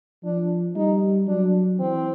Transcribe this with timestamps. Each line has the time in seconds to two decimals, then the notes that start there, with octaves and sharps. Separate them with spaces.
0.24 F3 D4
0.75 G3 D#4
1.27 F#3 D4
1.80 E3 C4